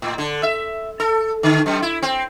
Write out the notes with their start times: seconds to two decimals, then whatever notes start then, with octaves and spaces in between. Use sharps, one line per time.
0.02 A2
0.18 D3
0.43 E5
1.00 A4
1.43 D3
1.66 F#2
1.82 E4
2.03 C4